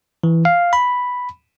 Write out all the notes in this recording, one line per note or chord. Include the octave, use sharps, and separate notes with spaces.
E3
F5
B5